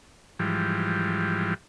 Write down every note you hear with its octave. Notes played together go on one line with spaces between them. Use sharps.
G#2 E3 F3 G3